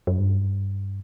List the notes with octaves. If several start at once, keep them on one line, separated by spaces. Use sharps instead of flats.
F#2
G2